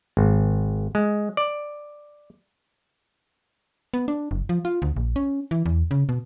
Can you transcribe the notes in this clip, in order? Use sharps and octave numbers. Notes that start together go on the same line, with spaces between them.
G#1
G#3
D5
B3
D4
F#1
F3
F4
D2
A#1
C#4
E3
E2
C#3
B2